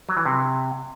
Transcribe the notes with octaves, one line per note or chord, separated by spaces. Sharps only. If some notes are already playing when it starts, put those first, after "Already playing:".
F#3
E3
C3